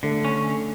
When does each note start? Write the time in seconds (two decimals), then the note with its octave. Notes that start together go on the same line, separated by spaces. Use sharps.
0.03 D3 A3
0.25 C#4